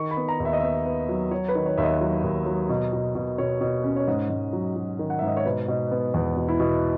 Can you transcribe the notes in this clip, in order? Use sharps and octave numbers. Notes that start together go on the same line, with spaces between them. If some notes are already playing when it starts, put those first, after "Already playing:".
Already playing: D#3 C#6
B5
B3
A#5
D#2
E5
D#5
B3 E5
B3
F#3
F#3 C#5
B4
D#3
C#5
D#2 E5
D#5
F#3
D#2
F#3
B2
B2
B2
B2 C#5
B2
C#4
C#5
G#2 D#5
G#2
F#3
F#3
D#3
F#5
G#2 E5
D#5
C#5
B2 B4
B2
B3
E2
B2
E4
B2